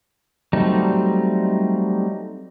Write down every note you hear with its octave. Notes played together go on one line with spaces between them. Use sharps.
F#3 G3 A3 C4 D#4